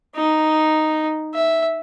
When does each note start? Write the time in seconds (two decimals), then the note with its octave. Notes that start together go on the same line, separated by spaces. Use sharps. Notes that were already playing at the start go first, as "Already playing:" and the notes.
0.16 D#4
1.34 E5